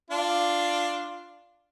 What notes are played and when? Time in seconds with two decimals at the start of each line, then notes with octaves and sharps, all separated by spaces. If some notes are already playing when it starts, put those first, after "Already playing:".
0.11 D4 F4